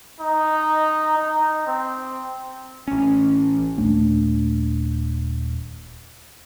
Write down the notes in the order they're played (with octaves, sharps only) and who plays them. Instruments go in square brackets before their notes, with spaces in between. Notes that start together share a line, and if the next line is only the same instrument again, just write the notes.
[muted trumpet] D#4
D#4
C4
[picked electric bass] A1 C#4
[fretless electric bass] D#1 A3 D4